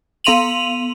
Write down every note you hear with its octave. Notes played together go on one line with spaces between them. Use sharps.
B3 F5 C6 D#7 F7 F#7